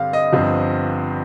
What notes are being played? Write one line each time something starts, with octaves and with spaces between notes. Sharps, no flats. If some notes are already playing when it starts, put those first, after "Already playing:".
Already playing: G2 D3 G3 C4 F5
D#5
G1 G2 F3 C4